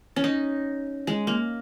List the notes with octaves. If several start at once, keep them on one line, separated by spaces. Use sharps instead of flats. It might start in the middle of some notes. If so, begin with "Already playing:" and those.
C#4
D#4
G#3
A#3